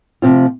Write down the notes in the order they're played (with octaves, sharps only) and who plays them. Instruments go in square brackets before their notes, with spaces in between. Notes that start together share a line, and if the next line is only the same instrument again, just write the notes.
[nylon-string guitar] D2 C3 F3 C4 F4